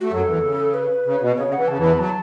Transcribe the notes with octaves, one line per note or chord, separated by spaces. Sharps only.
A3 F#4
F#2 F#3 A4
E2 E3
C#3
B4
C#3
B2
C#3 C#5
C#3
F#5
E3
C#3 A5
E2 E3
B5
F#3 A5